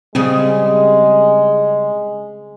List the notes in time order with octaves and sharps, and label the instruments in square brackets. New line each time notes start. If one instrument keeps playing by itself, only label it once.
[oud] C#3 G3 G#4 [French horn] G#3 [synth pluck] C4